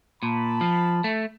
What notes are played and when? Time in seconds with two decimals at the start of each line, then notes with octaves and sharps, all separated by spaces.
0.23 A#2 A5 B5
0.61 F3
1.04 A3